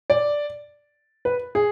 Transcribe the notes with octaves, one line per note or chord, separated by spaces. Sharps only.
D5
B4
G#4